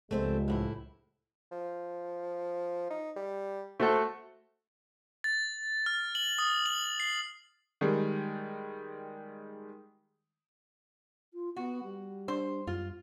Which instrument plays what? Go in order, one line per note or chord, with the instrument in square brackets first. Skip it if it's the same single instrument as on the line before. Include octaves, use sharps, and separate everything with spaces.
[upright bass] C#2 [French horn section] G2 F3 G#3 [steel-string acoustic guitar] A3 C4 C5
[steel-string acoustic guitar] F#2 A2 E4
[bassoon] F3
D#4
G3
[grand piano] A3 F#4 A4 [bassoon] C5
[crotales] A6
F6
F#7
D#6
F#7
C7
[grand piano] D#3 G3 G#3
[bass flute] F4
[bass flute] B3 [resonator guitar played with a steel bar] F#4
[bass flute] G3
[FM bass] D4 [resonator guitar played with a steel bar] C5
[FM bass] F#2 [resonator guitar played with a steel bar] F4